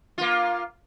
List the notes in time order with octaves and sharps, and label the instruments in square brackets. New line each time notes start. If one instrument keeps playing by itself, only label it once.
[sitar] A#3 F4